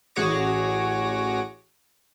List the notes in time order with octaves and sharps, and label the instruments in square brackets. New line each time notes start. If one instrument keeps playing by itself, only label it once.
[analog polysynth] A1 F#4 G#4 C#5 D6 A#6